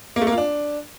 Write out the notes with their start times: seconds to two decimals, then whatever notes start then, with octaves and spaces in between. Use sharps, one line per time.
0.16 A#3
0.22 A3
0.27 A#3
0.32 F4
0.38 D4